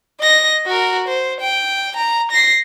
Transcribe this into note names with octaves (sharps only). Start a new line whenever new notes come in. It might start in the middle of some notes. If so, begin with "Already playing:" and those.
D#5 A#6
F#4 A#4
C5
G5
A#5
A#6 C7